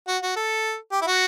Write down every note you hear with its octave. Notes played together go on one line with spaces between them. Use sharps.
F#4
F#4
A4
G4
E4
F#4